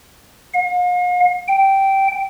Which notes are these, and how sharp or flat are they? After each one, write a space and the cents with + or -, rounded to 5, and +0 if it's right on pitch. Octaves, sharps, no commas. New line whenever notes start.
F5 +45
G5 -10